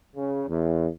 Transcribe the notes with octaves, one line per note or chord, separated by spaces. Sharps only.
C#3
E2